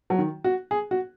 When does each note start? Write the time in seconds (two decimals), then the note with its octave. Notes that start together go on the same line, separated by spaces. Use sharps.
0.10 F#3
0.19 D#3
0.44 F#4
0.71 G#4
0.91 F#4